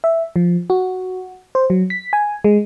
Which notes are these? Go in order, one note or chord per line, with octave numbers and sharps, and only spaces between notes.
E5
F3
F#4
C5
F#3
B6
G#5
G#3